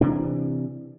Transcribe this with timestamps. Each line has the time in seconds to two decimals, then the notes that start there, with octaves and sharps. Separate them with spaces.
0.01 C3 E3 D4